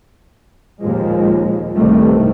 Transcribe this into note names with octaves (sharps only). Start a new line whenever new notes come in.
D#2 A#2 F3 G#3
C2 G2 C3 D#3 G3 A3